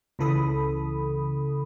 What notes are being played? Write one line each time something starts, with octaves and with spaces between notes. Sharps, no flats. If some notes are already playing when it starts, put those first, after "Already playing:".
C#2 C#3 E3 A4 B5 D#6